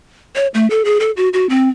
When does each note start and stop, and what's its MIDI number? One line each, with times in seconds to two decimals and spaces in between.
0.36 0.47 73
0.54 0.69 57
0.70 0.83 69
0.85 0.98 68
1.00 1.11 69
1.17 1.29 66
1.33 1.49 66
1.49 1.69 60